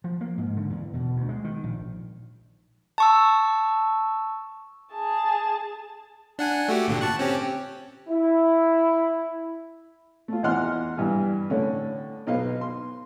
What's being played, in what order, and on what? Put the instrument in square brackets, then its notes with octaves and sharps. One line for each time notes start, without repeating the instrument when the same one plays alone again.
[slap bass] F3
A#3
G#2
D3
E2
B2
D2
G#3
D#3
A#1
[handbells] A5 C#6 E6
[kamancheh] G#4 A5
[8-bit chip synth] D4 F#5 G#5
A3 F#4 G4
G#1 A#2 D3
A5 C#6 F#6
C4 C#4 G4
[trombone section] E4
[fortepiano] A3 F4
E2 E3 D#5 F#5 C6 F6
G2 E3
A2 D3 C#4
B1 D#4 B4 D#5 F5
C6